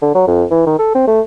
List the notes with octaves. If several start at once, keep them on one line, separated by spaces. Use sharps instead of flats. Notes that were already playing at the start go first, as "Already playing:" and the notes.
D3
F#3
F2
E3
D#3
A4
C4
A3